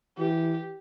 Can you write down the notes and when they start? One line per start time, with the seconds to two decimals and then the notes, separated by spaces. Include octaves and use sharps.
0.19 E3 G4